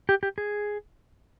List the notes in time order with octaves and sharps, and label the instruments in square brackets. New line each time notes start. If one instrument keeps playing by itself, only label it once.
[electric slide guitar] G4
G4
G#4